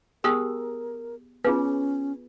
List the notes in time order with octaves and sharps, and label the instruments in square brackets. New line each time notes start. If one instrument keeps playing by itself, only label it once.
[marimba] B3 G#4 G5 [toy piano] G4 D#6 E6 [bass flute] A#4
[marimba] B3 [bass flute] C#4 [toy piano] F4 G#4 B4